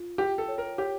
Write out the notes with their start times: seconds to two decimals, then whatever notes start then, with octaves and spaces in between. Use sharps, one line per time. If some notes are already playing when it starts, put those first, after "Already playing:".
Already playing: F4
0.18 G4 G5
0.38 A4
0.48 C#5
0.58 A#4
0.78 G4 C#5